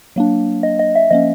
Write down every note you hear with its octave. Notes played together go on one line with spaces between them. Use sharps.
F#3 A#3 D4
D#5
D#5
E5
F3 A#3 C#4 D#5